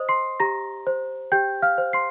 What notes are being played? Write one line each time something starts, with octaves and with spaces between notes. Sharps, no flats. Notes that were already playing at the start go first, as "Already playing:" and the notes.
Already playing: C5 D#5 D#6
C6 C7
G4 A#5 A#6
C5
G4 G5 G6
F5 F6
C5
C6 C7